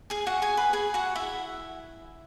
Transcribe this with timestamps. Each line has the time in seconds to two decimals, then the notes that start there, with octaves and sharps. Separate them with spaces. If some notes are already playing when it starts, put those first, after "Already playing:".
0.10 G#4 G#5
0.27 F#4 F#5
0.42 G#4 G#5
0.57 B4 B5
0.73 G#4 G#5
0.94 F#4 F#5
1.16 E4 E5